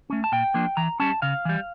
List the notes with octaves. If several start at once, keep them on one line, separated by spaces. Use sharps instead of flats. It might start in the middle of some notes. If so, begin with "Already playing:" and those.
A3 C#4
A5
A#2 G5
F3 A#3 D4
E3 A#5
G3 C#4 A5
C#3 F5
E3 G3